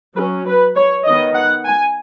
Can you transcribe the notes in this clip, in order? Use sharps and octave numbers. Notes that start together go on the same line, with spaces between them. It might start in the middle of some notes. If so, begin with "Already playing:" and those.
F#3 C#4 B4
B4
C#5
D#3 B3 D#5
F#5
G#5